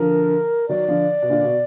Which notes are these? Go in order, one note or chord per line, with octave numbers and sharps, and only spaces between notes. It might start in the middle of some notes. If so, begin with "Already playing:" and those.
Already playing: D3 F3 A#4
D#3 F#3 D5
D3 F3
B2
A#2 D3
B2